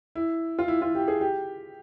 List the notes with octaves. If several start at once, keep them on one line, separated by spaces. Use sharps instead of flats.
E4
F4
E4
F4
G4
G#4
G4